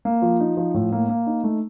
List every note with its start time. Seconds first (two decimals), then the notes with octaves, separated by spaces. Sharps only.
0.05 A#3
0.22 F3
0.40 D#4
0.57 F3
0.74 A2
0.92 A#3
1.09 A#3
1.27 D#4
1.44 A3